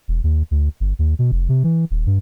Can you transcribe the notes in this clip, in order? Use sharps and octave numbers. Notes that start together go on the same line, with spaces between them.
E1
D#2
D2
G1
D#2
B2
F1
C3
E3
D#1
G2